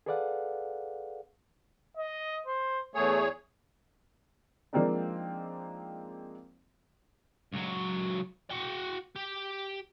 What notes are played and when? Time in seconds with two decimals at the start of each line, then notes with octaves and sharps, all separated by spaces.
0.06 G#4 A4 B4 D5 F5 F#5
1.97 D#5
2.47 C5
2.95 E2 A3 G#4 C#5
4.73 F3 G#3 A#3 C4 D4 D#4
7.53 C#2 F#3
8.50 F#4 G5
9.16 G4